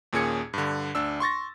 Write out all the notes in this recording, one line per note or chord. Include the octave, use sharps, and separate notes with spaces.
D#2 A#2 C#4 G#4 G#6 C#7
G2 D3
D2 D4 E6
C6 C#6 A6 A#6